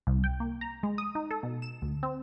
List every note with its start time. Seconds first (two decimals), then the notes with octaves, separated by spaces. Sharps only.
0.07 C2
0.24 G5
0.40 A#3
0.61 A#5
0.83 G#3
0.98 D#6
1.15 D#4
1.31 A4
1.43 B2
1.62 E7
1.82 D2
2.03 C4